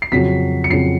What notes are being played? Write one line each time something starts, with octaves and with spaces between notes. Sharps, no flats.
C7
F2 C#3 F#3 B6
C#7
F2 C#3 F#3 C7